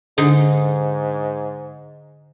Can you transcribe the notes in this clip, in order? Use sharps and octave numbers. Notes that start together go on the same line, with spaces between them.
G#2 D3 D#4